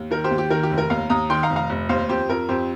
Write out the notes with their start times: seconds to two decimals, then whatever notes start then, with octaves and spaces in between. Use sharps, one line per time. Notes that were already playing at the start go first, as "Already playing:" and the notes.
Already playing: D#2
0.11 D#3 A#4
0.24 G4 C5
0.31 D#2
0.38 G4
0.50 D#3 A#4
0.63 G4
0.70 F1
0.78 A#4
0.90 D#2 F5 A#5
1.10 D#2 A#5 D#6
1.30 D#3 G5 C6
1.43 F5 A#5
1.50 F1
1.56 F5 A#5
1.69 F1
1.89 D#2 C5 F5
2.09 F2 G4 C5
2.29 F2 A#4
2.49 F2 G4 C5